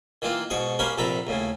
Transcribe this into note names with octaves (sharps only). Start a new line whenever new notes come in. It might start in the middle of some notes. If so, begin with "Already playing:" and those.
D#3 E3 A#3 F4
G#2 B2 C#6 D#6
A#3 C#4 G4 A#4 B4
A#1 C3 A4 A#5 B5
D#2 A2 C#3